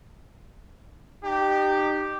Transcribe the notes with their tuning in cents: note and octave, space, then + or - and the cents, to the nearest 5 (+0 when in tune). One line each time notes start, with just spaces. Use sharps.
D#4 -35 G4 -5